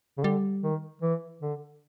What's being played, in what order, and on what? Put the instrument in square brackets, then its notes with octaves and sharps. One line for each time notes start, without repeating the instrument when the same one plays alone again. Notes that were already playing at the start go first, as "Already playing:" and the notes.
[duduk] C#3
[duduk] D3 [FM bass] G3
[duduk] D#3
E3
D3